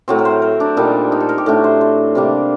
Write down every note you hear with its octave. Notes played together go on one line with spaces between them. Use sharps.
A2 F#3 C4
A#4
C5
A#4
D4
A#2 G3 D4 D#4
D#4
A4
A#4
G4
A2 A3 D4 F#4
C5
C5
C3 G3 A#3 D4